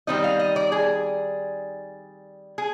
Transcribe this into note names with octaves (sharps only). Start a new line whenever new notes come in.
D#3 G3 C4 D#4 D#5
F5
D#5
D5
G#4
G#4